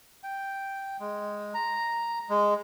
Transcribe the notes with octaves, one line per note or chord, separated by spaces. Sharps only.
G5
G#3
A#5
G#3